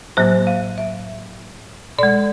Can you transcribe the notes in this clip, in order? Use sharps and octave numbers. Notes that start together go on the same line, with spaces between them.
A2 F#3 A#3 C5
F5
E5
B2 G#3 D5